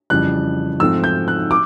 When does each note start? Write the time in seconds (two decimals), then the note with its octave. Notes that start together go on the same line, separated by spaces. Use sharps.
0.10 F2 C#3 E3 G3 F#6
0.80 G#2 F3 A3 C4 E6
1.04 G6
1.28 F#6
1.51 D6